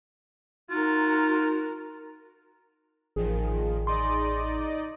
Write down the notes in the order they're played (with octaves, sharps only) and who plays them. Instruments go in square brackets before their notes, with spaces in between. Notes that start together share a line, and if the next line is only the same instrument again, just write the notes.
[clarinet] D#4 [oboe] F4 [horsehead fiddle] F#4 A#4
[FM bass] A1 [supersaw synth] A#2 D#3 F3 [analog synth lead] G#4
[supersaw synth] D#4 D5 D#5 [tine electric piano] C6